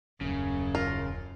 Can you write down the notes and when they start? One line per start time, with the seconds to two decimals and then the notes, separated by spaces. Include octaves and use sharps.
0.21 D#1 F#2 C#3
0.75 F4 A#4